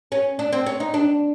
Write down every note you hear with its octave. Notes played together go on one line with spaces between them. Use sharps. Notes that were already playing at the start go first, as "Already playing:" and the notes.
C#4
D4
C4
C#4
D#4
D4